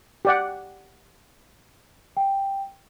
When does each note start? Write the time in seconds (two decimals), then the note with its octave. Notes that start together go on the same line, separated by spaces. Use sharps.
0.25 G4 D5 F#5
2.17 G5